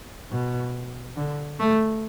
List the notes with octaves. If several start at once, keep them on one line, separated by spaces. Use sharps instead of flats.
B2
D3
A3